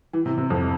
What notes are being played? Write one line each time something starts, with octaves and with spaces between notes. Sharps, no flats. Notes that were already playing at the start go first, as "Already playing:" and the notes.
E3
C3
C3
F2